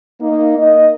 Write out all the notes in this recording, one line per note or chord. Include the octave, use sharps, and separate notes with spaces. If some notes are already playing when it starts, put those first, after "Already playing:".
A#3 D#4
D#5